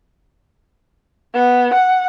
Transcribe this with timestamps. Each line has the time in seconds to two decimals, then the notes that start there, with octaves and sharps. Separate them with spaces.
1.34 B3
1.74 F#5